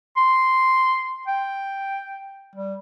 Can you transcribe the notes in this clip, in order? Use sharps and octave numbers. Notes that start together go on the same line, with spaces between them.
C6
G5
G3